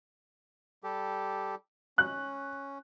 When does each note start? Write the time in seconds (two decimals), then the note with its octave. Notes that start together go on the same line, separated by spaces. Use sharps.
0.84 G3 G4 A4
1.98 C#4 F#6